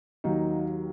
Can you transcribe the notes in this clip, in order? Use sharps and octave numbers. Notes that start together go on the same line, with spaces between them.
D#2 D#3 F#3 D#4